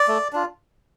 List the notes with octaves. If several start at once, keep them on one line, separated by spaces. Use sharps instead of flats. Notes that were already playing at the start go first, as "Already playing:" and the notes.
Already playing: D5
A3
D4 F4